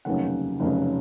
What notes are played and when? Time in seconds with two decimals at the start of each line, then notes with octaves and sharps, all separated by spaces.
0.05 F1 D#2 C#3 F#3 F#5
0.60 F1 D#2 C#3 F#3